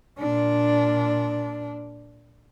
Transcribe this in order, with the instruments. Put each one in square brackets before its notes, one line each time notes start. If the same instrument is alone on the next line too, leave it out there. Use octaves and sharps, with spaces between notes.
[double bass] A#2 D4